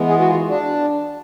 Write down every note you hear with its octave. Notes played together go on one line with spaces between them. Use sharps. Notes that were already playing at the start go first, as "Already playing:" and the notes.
Already playing: E3 G#3 B3
G#4
F#4
F4
D4